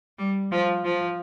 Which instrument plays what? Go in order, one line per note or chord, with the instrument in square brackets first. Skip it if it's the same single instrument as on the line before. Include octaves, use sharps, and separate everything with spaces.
[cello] G3
F3
F3